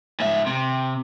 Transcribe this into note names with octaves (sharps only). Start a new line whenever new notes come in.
G#2 E5
C3